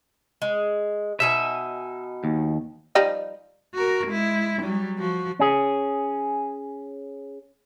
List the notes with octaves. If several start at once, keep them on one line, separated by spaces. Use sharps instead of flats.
G#3
B2 D#4 E5 G#5
D#2
F3 G3 D#4
F#4 A#4
G#3 E4
F#3 G3
F3 F#4
C#4 G#4